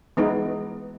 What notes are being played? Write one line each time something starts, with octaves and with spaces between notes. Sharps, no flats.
E3 G#3 B3 D#4